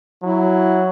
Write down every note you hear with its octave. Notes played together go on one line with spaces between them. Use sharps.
F#3 E4